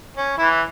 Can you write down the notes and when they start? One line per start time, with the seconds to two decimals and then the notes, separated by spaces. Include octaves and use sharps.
0.17 C#4
0.38 E3 E4
0.51 E4